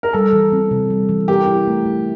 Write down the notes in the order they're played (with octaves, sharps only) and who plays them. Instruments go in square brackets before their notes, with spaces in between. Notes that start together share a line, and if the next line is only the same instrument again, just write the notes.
[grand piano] A#4
[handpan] G3 [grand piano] A4
[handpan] E3
C4
C3
G3
E3
[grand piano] G4 [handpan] A#4
[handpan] E4
A3
A3